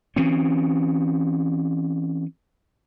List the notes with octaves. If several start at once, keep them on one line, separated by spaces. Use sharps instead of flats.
E3 C4 C#4